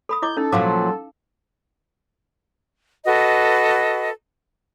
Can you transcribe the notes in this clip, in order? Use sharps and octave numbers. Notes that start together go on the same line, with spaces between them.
A4 B5 D#6
E4 D#5 D6 G6
C#4 D#4 A4
A#2 F3 F#3 F5 A5 D6
F#4 A4 B4 D#5